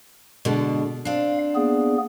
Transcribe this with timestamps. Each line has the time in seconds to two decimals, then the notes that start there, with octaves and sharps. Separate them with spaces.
0.45 B2 D3 G#3
1.05 C4 D4 F5
1.55 A#3 B3 G#4